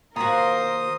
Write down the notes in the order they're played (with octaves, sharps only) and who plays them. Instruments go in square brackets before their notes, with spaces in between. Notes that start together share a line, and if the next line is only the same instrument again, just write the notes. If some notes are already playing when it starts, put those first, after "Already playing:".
[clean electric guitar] D#2 A#5 [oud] F4 F#4 [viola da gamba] A#4 C5 [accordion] D#6